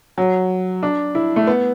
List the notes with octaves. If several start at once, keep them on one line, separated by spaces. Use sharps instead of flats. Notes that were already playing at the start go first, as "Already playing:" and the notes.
F#3
D4
E4
A3
B3